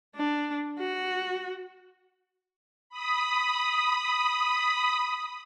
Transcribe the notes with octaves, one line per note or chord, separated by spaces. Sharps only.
D4
F#4
B5 D#6